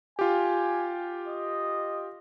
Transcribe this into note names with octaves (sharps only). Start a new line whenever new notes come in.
F4 G4 G#5
D#5